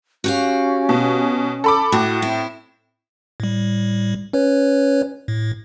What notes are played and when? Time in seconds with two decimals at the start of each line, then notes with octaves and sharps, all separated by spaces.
0.24 C#4 F#4 G4 F5
0.89 B2
1.64 A4 B5 D6
1.92 A2 E4 F#4
2.22 C4 E4
3.40 A2 G3
4.33 C#4 B4 C#5
5.28 A2